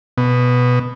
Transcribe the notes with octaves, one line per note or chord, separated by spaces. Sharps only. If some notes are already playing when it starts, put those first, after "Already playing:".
B2